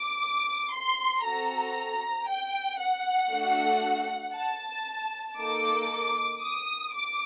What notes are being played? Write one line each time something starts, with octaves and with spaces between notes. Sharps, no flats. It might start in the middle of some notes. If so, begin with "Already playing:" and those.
Already playing: D6
C6
C4 F#4 A4 A#5
G5
F#5
A3 D4 F#4 A4
A5
A#3 D#4 A4 D6
D#6
D6